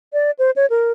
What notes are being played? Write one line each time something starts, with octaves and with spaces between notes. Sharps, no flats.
D5
C5
C#5
A#4